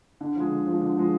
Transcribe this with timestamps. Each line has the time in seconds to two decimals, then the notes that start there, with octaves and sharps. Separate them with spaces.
0.21 D3
0.36 F3 G#3
0.51 D3
0.67 F3 G#3
0.81 D3
0.97 F3 G#3